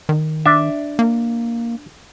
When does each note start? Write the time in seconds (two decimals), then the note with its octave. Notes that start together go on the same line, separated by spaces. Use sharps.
0.09 D#3
0.46 D4 E5
0.99 A#3